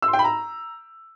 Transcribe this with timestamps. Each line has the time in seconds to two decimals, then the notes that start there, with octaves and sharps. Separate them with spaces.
0.02 E6
0.08 C6
0.13 G5
0.19 B5
0.24 A#5